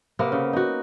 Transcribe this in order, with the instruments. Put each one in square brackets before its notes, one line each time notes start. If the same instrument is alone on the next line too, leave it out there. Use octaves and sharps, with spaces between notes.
[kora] C3 A#3 B3
C#3
D#4 F#4